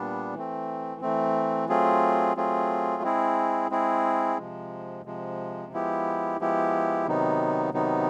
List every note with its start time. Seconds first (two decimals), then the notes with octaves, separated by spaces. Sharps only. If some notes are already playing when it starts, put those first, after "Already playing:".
Already playing: A#2 G3 B3 D4
0.34 E3 A3 C4
1.01 E3 A3 C4
1.69 F#3 A3 C4 F4 G#4
2.36 F#3 A3 C4 F4 G#4
3.03 G#3 C4 E4 G#4
3.70 G#3 C4 E4 G#4
4.38 C3 F3 G#3
5.05 C3 F3 G#3
5.72 F3 G#3 B3 E4 G4
6.40 F3 G#3 B3 E4 G4
7.07 C3 D#3 F#3 B3 D#4
7.74 C3 D#3 F#3 B3 D#4